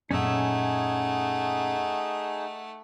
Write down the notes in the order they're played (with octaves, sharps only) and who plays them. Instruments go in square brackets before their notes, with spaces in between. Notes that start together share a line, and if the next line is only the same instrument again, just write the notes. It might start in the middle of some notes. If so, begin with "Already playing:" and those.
[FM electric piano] F#2 A#2 [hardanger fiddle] A3 F#5 [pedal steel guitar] C#4 E6 [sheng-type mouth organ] D#4 G#4